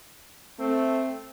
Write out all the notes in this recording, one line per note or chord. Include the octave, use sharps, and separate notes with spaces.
A3 C4